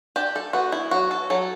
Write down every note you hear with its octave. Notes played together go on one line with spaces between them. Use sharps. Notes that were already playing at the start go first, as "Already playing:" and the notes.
D4 G4
A4
B3 F#4
E4
F#3 F#4
A4
F#3 A4